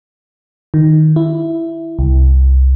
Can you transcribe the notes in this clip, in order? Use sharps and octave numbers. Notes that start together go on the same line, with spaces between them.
D#3
E4
C2